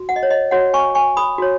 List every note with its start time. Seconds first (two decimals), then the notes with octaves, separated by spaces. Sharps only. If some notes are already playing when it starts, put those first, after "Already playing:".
Already playing: F#4
0.09 F#5
0.16 D#5
0.23 C#5
0.30 D#5
0.51 F#4 C#5 F#5
0.74 G#5 C#6
0.95 G#5 C#6
1.17 B5 D#6
1.38 F#4 C#5